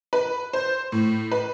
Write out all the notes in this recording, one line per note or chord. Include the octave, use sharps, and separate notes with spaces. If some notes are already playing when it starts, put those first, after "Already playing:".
B4
C5
A2
B4